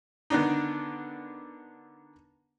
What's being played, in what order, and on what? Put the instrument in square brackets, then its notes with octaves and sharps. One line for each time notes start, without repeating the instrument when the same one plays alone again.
[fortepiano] D3 D#3 B3 D4 D#4